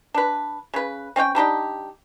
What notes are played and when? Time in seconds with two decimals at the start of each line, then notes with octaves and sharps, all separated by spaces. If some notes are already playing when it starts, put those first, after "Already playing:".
0.14 D4 B4
0.74 C#3 B4
1.16 C4 C#4 D5 G5
1.35 G3 D4 D#4 G4